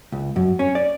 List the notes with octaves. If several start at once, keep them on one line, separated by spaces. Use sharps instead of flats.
C#2
F#2
C#4
D5